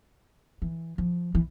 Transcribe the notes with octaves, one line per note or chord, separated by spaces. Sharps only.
E3
F3
E3